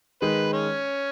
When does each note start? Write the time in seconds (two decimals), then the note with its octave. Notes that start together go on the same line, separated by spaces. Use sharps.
0.21 D#3 G#3 D#4 B4
0.53 C#4